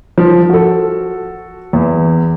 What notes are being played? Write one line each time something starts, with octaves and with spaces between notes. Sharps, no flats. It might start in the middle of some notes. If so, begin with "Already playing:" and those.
F3
F#4 A4
E2